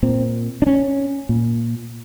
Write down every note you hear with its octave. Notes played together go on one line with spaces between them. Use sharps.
A#2 C4
D4
C#4
A#2